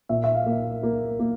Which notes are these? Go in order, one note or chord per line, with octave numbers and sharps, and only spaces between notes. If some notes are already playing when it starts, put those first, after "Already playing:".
A#2 E5
E5
F5
A#3
A#3
A#3